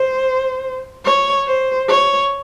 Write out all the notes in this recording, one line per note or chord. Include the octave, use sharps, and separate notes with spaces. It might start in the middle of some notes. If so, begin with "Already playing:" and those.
Already playing: C5
C#5
C5
C#5